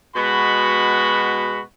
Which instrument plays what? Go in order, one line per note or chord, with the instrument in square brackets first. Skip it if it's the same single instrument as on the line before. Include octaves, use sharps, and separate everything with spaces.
[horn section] B2 G#3 B3 F#4 B5